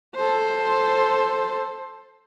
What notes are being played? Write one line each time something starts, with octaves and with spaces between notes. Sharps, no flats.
A4 C5